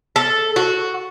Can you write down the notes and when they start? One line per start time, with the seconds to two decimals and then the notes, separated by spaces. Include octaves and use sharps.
0.16 A4
0.56 F#4